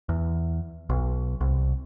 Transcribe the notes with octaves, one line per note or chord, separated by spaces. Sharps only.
E2
B1
C2